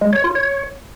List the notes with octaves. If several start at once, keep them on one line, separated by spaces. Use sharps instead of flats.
G#3
C#5
F4
C#5